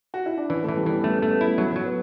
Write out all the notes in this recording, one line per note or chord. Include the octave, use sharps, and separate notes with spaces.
F#4
E4
D4
E3 C#4
A3
E3
G3
E3 B3
A3 C#4
A3
B3
E4
F#3 A3
F#3
B3